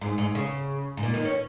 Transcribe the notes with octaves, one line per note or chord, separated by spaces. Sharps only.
G#2
G#2
C#3
G#2
A#2
D#3
C#4